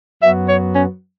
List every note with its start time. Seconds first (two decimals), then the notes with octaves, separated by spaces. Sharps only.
0.22 F#2 F#3 B3 F#4 E5
0.48 C#5
0.75 C#4